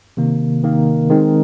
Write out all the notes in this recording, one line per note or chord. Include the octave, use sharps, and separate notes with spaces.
C3 D#3 A#3
C3 D#3 A#3
D#3 G#3 C4 D#4